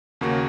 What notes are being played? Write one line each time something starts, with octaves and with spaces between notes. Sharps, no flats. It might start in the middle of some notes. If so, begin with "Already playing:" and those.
D#2 C#3 A#3 F#4